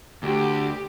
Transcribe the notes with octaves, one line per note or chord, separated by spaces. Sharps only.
D2 G4